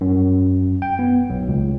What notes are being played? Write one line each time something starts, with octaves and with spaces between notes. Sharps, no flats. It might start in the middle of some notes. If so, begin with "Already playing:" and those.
F#2
G5
B3
B1
C#2